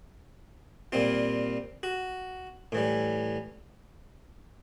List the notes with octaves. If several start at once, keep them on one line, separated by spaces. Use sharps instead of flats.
A#2 G3 C4 F4
F#4
A2 E3 G3